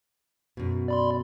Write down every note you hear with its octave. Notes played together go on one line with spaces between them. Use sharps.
F#2 B2
D5 B5 C6